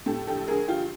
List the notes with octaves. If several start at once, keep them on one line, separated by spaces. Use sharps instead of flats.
A2 G4 A4
A#1 G4 A4
A#1 G#4 A#4
A#1 F4 G4